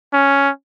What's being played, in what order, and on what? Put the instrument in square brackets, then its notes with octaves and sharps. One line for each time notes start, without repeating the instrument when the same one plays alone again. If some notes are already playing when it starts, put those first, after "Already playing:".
[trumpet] C#4